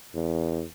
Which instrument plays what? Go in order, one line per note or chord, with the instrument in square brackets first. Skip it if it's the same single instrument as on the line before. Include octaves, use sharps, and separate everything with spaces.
[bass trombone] E2